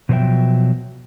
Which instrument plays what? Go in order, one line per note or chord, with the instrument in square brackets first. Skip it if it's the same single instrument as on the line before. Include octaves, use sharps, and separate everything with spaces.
[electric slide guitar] B2 F3 F#3 C5 E5 G5